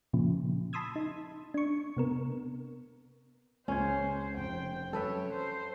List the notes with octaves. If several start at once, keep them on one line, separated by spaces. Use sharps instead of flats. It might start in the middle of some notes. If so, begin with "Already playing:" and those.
A#2 C#3 F3
A5 B5 C6 D#6 E6 G#6
D#4
D4 C#6
C3 B3 A#4
C#2 C#4 C5 G#6
F1 G5
F#2 A4 B4 C#5 E5
C5